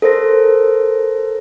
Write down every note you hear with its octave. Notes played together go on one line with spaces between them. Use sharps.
A4 A#4 C5 A#6